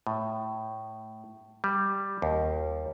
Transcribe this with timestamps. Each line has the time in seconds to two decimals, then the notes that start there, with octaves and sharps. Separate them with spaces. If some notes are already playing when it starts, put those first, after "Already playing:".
0.07 A2
1.64 G3
2.22 D#2